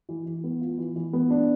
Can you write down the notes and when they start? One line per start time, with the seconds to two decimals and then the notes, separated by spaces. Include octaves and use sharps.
0.09 E3
0.26 E3
0.44 B3
0.61 F4
0.78 E3
0.96 E3
1.13 B3
1.30 D4